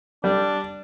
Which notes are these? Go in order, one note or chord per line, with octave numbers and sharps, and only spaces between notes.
G3 D4